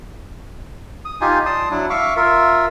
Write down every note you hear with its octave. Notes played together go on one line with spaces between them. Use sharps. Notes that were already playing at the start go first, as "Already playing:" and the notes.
D#6
D#4 F4 G4 G#5
D5 A5 C6 D#6
F#3 D4 E4
E5 F5 C#6 D6
F4 A#4 E5